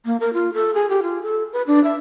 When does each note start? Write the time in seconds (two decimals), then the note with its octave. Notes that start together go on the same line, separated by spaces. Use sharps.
0.05 A#3
0.20 A#4
0.33 F4
0.54 A4
0.74 G#4
0.90 G4
1.03 F4
1.23 A4
1.53 B4
1.67 D4
1.84 E5